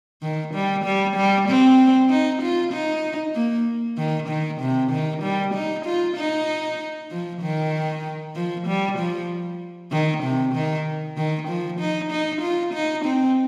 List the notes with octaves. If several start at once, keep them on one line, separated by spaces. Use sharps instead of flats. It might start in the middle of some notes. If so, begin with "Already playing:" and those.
D#3
G3
G3
G3
C4
D#4
F4
D#4
A#3
D#3
D#3
C3
D#3
G3
D#4
F4
D#4
F3
D#3
F3
G3
F3
D#3
C3
D#3
D#3
F3
D#4
D#4
F4
D#4
C4